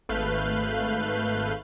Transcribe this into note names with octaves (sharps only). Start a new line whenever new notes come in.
G#1 A3 B4 F5 F#6 G6